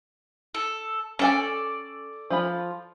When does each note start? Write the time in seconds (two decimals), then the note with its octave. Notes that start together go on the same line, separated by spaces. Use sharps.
0.54 A4
1.19 C#4 A4 D5 G5 G#5
2.30 F3 F4 B5